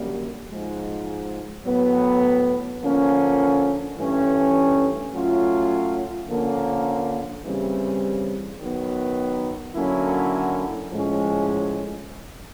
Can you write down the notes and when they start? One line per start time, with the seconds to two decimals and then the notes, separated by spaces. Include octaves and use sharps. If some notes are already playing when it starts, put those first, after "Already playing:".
Already playing: F#2 D3 G3 A#3
0.51 G#2 F3 G#3
1.65 A2 F#3 B3
2.81 D3 F3 A#3 C#4
3.97 G2 E3 A3 C#4
5.12 F#3 A3 C#4 F4
6.29 D3 F3 A#3 C#4
7.44 C#3 E3 G3 C4
8.60 D#3 F#3 B3
9.75 D3 F#3 A#3 C#4 E4
10.91 A2 F3 G#3 C#4